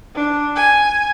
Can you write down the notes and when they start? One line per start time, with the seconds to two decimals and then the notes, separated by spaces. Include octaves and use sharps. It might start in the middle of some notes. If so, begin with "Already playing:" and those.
0.15 D4
0.56 G#5